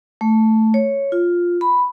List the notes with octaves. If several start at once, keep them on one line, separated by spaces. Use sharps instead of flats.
A3
C#5
F4
B5